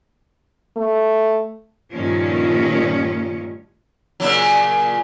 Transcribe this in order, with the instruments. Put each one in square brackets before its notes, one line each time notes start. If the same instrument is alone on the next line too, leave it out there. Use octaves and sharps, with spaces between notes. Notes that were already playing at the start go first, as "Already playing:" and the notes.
[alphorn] A3
[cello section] G2 A#2 D#3 F3 A3 C#4
[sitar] A#2 C#3 F#3